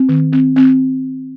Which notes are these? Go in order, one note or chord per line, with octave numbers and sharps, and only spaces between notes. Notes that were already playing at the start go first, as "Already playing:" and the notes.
Already playing: C4
D#3
C4
C4